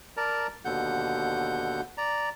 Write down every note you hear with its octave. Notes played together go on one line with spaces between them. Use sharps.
A#4 D5 A5 A#5
D#2 B2 D3 F#5 G6
D5 A#5